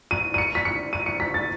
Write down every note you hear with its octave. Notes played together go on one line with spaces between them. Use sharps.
D#7
D#7
C#7
B6
C#7
D#7
C#7
B6
A6